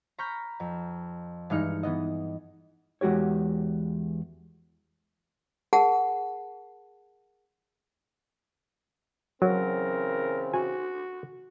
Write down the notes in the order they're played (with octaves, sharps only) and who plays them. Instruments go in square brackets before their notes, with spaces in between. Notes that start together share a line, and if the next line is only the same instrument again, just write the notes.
[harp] A#5 B5 C#6 F6 G6
F2
G2 E3 G#3 D#4 F6 C#7
E3 B3 D#5
[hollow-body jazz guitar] E2 G#3 F#4 G4 C#5
[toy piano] G#4 A#4 F#5 A5
[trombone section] C#3 E3 C4 [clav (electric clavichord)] F#3 [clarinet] A#4
[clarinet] F#4 [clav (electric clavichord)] G#5